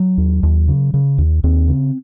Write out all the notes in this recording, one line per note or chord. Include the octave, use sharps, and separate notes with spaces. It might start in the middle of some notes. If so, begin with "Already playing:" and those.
Already playing: F#3
D#2
D#2
C#3
C#3
D#2
D#2 C4
C#3